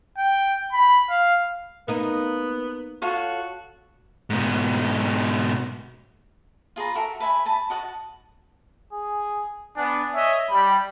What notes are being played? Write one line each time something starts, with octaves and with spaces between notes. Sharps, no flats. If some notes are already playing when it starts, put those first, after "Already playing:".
G5
B5
F5
A#3 B3 D#4
F4 F#4 A4 C#5
G#2 B2
F4 G#4 B4 A#5
F#4 A4 A#4 E5
B4 E5 G#5 B5
G#5 A5 B5
F#4 D#5 F#5 A5
G#4
B3 D4 G#5
C#5 D#5 E5
G3 B5